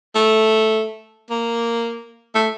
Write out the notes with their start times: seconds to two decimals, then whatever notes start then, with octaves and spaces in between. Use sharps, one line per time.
0.16 A3
1.30 A#3
2.35 A3